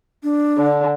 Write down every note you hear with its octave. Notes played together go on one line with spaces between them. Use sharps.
D4
D3